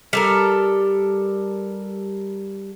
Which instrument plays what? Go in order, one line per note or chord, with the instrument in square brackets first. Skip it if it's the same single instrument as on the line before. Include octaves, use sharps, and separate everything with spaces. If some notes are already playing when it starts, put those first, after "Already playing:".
[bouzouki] G3 A4 A#4